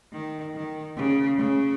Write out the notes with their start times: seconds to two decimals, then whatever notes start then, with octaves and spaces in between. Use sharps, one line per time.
0.13 D#3
0.54 D#3
0.96 C#3
1.38 C#3